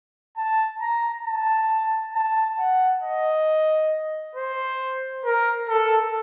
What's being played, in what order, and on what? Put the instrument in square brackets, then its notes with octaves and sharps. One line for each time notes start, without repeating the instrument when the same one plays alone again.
[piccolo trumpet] A5
A#5
A5
A5
F#5
D#5
C5
A#4
A4